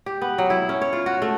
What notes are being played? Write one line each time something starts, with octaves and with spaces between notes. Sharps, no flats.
G4
B3
F#3
E4
C#4
C#5
F4
F#4
A3